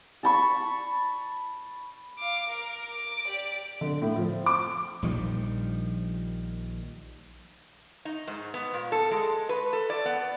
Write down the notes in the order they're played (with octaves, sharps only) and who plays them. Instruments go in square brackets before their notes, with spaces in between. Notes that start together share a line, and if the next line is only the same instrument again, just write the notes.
[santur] A5 B5 C#6
[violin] F5 D6
A#4
D6
G4 D5
[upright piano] D3
A2
F3
D6
[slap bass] A#1 D#3 F3 G3
[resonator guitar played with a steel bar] D#4
G#2
B3
A#2
A4
G#3
B4
A4
D5
B3